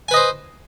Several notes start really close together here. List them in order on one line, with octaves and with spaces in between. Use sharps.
G#5 B4 D#5 C5